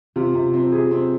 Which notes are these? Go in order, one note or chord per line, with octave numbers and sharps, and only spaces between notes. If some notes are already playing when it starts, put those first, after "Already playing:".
C3 F4
C3
C4
C3 G#4
C4